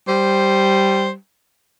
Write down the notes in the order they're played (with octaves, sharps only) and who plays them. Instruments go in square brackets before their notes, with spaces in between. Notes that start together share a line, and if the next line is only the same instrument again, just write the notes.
[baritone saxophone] G3 [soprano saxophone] C5